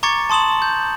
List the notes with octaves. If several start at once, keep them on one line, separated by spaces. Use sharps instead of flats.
A#5 C#6 D6 G#6 A6 C#7
A5 C6 D#6 E7 F#7
G6